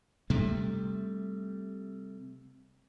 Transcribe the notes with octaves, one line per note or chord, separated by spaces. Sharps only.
C3 G3 A3